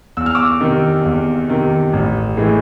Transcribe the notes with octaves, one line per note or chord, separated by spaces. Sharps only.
E2 E6
F6
D6 E6
C3 D#3
E2
C3 D#3
A1
A2 E3 G#3